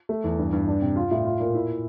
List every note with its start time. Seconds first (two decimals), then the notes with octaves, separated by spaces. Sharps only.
0.09 A3
0.24 E2
0.38 G2
0.52 G2
0.68 D4
0.82 C3
0.96 F4
1.11 A2
1.25 F4
1.40 A#2
1.55 E4